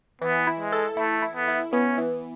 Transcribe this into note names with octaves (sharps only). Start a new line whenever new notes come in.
E3 B3
E4
G#3
A4
A3 E4
E4
B3
E4
B3 C#4
E3